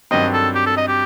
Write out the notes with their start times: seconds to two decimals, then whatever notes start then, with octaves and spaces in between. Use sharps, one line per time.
0.11 G2 D#3 F#3 C4 D#5
0.33 A4
0.55 G4
0.66 A4
0.77 D#5
0.88 G4